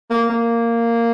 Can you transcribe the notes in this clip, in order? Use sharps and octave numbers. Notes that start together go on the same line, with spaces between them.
A#3
A#3